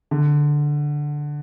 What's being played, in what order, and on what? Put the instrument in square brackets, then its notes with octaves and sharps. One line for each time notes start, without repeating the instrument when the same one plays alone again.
[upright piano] D3